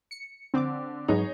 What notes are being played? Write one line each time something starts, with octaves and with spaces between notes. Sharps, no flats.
C#7
D3 C4 D6
G#2 F#3 B3 D#4 G#4 C#5